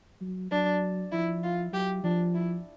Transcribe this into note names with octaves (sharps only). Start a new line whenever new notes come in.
F#3
F#3 D4
F3 E4
F4
F#3 G4
F3 D4
E4